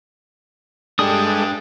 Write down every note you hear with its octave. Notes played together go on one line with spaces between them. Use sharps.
G3 G#3 D4 G4 A4 D#6